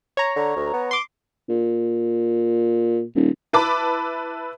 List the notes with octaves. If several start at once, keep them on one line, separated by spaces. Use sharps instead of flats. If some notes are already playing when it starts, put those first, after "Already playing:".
C#5 A#5
D3
D2
B3
C6 D6
A#2
D#1
E4 B4 A5 B5 D6